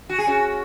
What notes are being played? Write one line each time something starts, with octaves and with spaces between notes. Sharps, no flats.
F#4
G#4
C#4 F#4